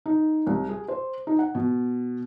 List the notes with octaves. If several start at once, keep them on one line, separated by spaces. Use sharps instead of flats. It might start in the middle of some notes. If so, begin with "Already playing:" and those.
D#4
C2
G#4
C5
D#4
F#5
B2